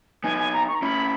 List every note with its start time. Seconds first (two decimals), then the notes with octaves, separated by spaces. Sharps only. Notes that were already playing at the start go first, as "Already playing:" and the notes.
0.23 B3 D#4 G#5
0.38 G#5
0.53 A#5
0.68 C#6
0.75 A#5
0.82 C#4 E4 B5